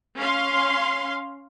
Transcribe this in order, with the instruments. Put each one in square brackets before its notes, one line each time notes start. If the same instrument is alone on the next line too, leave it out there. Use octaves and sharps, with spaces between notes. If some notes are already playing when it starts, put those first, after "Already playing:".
[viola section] C#4 F5 C6